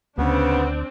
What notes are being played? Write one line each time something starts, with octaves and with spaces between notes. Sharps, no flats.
D2 C#3 B3 C4 D4